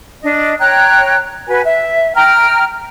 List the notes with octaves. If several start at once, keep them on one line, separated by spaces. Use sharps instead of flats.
D4 D#5
C#5 G5 A#5 F#6
F#4 B4 G#5
E5
G5 A#5 F6